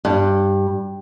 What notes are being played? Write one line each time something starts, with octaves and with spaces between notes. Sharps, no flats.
G2